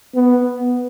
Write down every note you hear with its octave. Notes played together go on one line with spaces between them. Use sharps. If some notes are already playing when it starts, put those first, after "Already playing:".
B3